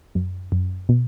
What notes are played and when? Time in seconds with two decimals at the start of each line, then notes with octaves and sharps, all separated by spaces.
0.15 F#2
0.52 F#2
0.89 B2